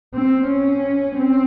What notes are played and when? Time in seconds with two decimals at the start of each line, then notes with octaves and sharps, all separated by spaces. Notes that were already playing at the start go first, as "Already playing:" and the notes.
0.14 C4
0.48 C#4
1.16 C4